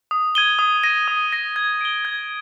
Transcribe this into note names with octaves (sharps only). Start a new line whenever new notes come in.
D#6
G#6 D#7 G7
D#6
A#6 D#7
D#6
A#6 D#7
G#6
D7 G7
G#6